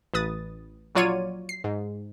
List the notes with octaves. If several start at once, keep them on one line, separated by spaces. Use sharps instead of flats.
A1 B4 D#6 A6
A#1 F#3 F4 C#5 D5 D#7
C7
G#2